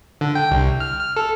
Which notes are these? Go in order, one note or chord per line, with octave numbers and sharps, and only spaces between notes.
D3
G5
C2
F6
F6
A4